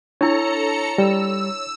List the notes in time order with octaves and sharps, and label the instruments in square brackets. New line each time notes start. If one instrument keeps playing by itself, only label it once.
[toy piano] D4 E4 [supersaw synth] A4 A#5 C#7 [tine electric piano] C#5
[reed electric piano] G3 [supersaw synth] E6